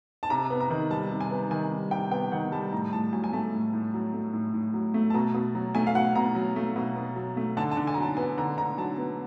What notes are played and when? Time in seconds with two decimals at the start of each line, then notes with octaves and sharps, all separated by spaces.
0.23 A5
0.30 C3 A#5
0.50 B3
0.60 A#5
0.70 D#3
0.91 G3 A5
1.11 C3
1.21 G#5
1.31 B3
1.51 D#3 G#5
1.72 G3
1.91 C3 G5
2.11 B3 G5
2.32 D#3 F#5
2.52 G3 A5
2.72 A2 A#5
2.93 A2 A5
3.12 F#3 G#5
3.24 G#5
3.33 A3 A5
3.54 A2
3.73 A2
3.94 F#3
4.13 A3
4.33 A2
4.54 A2
4.74 F#3
4.94 A3
5.10 A5
5.14 B2 A#5
5.34 B2
5.55 F#3
5.75 A3 G#5
5.87 F5
5.95 B2 F#5
6.15 B2 A#5
6.35 F#3
6.56 A3
6.76 B2
6.96 B2
7.16 F#3
7.37 A3
7.57 D3 A5
7.71 A5
7.77 D3
7.87 G#5
7.94 A#5
7.97 F#3
8.02 A5
8.17 B3 G#5
8.38 D3 A#5
8.58 D3 A#5
8.78 F#3 A5
8.98 B3